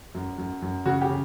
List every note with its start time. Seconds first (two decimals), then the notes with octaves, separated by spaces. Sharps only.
0.15 F#2
0.38 F#2
0.62 F#2
0.86 C#3 F#4
1.02 G4
1.09 C#3